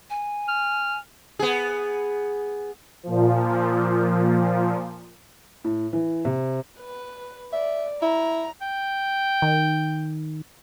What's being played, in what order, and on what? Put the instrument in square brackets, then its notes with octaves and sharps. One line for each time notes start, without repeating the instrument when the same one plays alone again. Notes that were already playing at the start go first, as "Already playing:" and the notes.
[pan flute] G#5
[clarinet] F6
[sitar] B3 G#4
[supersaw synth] A#2 F3
[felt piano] A2
E3
C3
[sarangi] B4
[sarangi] D5 [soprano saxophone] E5
[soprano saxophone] E4 [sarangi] A#5
[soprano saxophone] G5
[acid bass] D#3